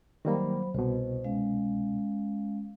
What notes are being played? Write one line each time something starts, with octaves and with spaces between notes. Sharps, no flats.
D#3 F#3 G3 A#3 C5 B5
C2 B2 C5
G#3 C#4 F5